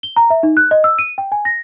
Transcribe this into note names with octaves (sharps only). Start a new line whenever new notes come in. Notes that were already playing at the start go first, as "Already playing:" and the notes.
G7
A#5
E5
D#4
F#6
D#5
E6
D#7
G5
G#5
A#6